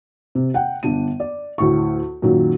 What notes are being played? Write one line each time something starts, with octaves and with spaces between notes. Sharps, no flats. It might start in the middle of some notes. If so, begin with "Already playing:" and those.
C3
F#5 G5
G1 D4 D#7
D5
D2 A2 C#6
F#2 A#2 D#3 F#3